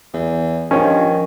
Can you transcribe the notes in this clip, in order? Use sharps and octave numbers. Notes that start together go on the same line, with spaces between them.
E2
G2 D#3 F3 C#4